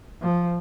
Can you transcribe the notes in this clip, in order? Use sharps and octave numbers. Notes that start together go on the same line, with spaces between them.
F3